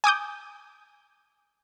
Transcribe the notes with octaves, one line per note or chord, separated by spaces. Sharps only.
G#5 D6 D#6 G6